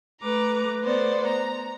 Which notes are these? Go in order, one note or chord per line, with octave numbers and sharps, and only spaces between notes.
A3 B4 A#5 D6
A3 B3 C5 D5
A#5